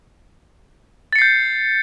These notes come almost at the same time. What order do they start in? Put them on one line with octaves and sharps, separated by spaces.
A6 C#7 C7 G6